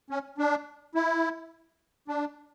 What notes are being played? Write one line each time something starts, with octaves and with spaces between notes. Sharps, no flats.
C#4
D4
E4
D4